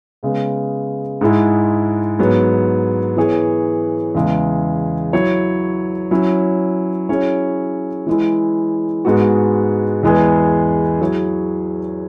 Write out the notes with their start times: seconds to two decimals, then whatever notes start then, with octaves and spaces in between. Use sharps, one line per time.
0.23 C#3 G#3 B3
1.21 G#2 G#3 E4
2.19 G#2 F#3 B3
3.17 E3 B3 G#4 C#5
4.15 E2 C#3 G#3
5.13 F#3 E4 C#5
6.11 F#3 C#4 E4
7.09 F#3 C#4 E4 G#4 C#5
8.07 E3 G#3 E4
9.05 G#2 G#3 B3 F#4
10.03 E2 E3 G#3 B3 G#4
11.01 F#3 E4 G#4 C#5